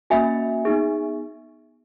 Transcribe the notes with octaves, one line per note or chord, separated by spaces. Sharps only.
A#3 C#4 F#4 E5 G#5
B3 D#4 G#4